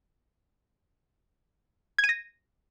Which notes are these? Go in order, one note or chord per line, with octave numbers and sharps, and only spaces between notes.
G#6
D#7
A#6